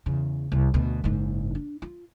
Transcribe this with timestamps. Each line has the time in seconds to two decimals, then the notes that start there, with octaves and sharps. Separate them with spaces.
0.06 E2 C#3
0.52 C2
0.74 D2 B2
1.04 F#1 G#2
1.55 D4
1.82 F4